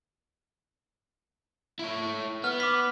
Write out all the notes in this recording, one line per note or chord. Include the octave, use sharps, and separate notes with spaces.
E4 C#5
B3 F6
D6 B6